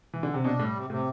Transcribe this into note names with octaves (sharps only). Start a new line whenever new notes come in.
E3
D3
C3
B2 D4
A2 G3
C3
A2 C3